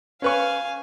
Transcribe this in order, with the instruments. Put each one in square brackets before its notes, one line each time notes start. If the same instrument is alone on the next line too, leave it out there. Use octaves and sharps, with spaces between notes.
[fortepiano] C#4 B4 C#6 [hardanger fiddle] F5 G#5